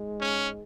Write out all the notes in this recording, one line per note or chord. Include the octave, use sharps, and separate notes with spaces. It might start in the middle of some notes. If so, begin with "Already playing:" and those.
Already playing: G#2 G#3
C#4